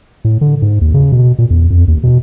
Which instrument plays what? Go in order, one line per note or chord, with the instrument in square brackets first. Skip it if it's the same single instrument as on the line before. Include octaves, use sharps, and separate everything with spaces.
[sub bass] A2
D3
G#2
D#2
C#3
B2
A#2
E2
F2
D#2
B2